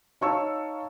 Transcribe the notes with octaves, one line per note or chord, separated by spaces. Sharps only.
D#4 C#5 F5 A5 C#6 E6